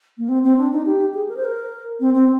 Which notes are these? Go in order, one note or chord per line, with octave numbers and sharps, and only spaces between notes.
A#3
C4
C4
D4
D#4
G4
G#4
A#4
C5
A#4
C4
C4